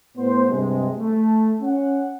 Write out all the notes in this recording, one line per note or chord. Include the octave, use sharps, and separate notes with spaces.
A2 B3 C5
G2 C3 G#3
A3
C#4 F#5